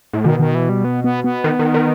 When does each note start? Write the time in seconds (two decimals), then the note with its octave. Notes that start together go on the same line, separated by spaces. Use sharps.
0.13 A2
0.24 B2 D#3
0.40 D#3
0.55 E3
0.69 G3
0.84 B3
1.04 B3
1.24 B3
1.44 D#3
1.59 D#3
1.74 D#3